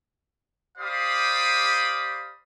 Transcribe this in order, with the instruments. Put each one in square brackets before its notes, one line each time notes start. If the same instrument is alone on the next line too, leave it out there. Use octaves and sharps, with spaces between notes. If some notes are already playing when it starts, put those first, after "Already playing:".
[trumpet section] G4 C5 D5 F5 B5 D#6